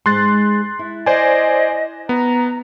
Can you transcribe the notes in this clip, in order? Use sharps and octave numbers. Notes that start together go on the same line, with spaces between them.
G#2 G#3 C6 F#6 A6
E4
C5 D5 D#5 G#5
B3 A#5